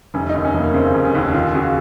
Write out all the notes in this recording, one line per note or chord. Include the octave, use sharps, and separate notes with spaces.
F1 C#4
D#2 D#4
C#4
F1
A#3
C#3 C4
F1
C#4
D#2
D#2 F4
C#3 F#4